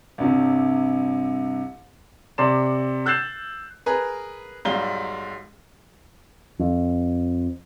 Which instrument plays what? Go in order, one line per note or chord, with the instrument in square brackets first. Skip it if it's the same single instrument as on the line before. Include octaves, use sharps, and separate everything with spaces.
[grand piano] C2 G2 C3
C3 D5 C6 E7
E6 F#6 G6 A6 C7 E7
[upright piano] G#4 A#4 B4
B1 G#2 G3 F5 G7
[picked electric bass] F2